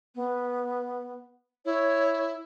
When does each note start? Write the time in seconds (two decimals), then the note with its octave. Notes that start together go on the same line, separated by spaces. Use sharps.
0.15 B3
1.65 E4 C#5